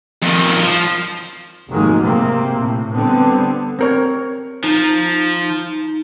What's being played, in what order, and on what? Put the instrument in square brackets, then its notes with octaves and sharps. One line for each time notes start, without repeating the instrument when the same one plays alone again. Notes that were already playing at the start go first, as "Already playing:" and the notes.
[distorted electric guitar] F2 D#3
F3
[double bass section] F1 G#2 D#3 F#3 G#3 A#3
C3 A#3 C4
A2
D3 G3 B3 C4
[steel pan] C4 A#4 C#5
[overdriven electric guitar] F3 [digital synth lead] D#4